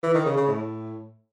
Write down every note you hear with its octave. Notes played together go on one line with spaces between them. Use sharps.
E3
D#3
C#3
C#3
A2